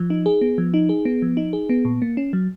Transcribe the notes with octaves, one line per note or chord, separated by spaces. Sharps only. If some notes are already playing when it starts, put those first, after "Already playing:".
Already playing: F3
D#4
G#4
B3
F3
D#4
G#4
B3
F3
D#4
G#4
B3
A#2
A#3
C#4
F#3